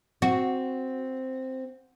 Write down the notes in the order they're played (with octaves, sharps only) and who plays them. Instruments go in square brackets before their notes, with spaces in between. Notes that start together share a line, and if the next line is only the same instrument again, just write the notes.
[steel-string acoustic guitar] C4 [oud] F#4